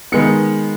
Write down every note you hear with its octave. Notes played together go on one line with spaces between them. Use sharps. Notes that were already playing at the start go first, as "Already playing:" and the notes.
D#3 G#3 B3 C#7